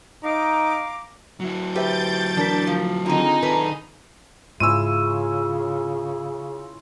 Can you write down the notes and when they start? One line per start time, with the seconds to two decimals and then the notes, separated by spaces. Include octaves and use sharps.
0.24 D#4 F5 A#5 D6
1.40 F#3 E4
1.75 G4 B4 C5 E5 G6 A6 D7
2.37 E3 D4 A#4 B6
2.67 F3
3.06 D3 D#3 C4 D#4 F4 G#4
3.42 D#3 A4 B4
4.60 G#2 C#3 C#4 E4 F4 E6 D#7